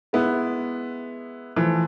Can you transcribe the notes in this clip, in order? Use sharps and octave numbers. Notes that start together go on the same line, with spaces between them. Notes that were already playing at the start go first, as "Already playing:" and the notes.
G#3 B3 E4
E3 F3 A3